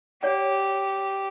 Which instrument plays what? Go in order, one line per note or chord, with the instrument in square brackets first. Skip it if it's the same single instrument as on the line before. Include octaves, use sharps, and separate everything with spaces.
[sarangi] G4 [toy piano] C#5 D5 F#5